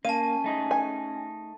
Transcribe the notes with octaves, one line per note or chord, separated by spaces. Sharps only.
A#3 C#4 F5 A5 D#7
A3 D#4 G#4
G#5